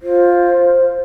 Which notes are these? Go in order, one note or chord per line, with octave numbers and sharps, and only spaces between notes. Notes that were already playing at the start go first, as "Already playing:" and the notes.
F4 C5